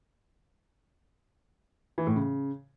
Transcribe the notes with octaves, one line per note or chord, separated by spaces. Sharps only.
E3
A2
C#3